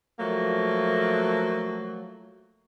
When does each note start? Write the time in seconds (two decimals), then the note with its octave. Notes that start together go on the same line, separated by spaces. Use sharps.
0.19 F3 F#3 A3 A#3